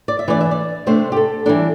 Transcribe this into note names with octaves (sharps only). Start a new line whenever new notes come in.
D5
E5
E3 A3 D4 D5
E5
D5
C3 A3 D4 C5
G4
A4
E3 G3 D4 A4